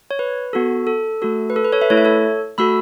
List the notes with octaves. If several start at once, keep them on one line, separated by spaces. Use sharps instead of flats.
C#5
B4
B3 F#4 A4
A4
A3 F#4 A4
B4
A4
B4
A4 C#5
B4 E5
A3 E4 A4 C#5
E5
A4 C#5
A3 F#4 A4 B5 E6